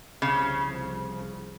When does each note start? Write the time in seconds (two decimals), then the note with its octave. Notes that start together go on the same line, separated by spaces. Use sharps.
0.22 C2 C#3 F3